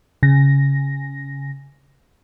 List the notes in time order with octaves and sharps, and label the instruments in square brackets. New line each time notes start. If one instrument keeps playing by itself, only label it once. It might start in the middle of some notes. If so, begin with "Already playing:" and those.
[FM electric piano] C#3 A#6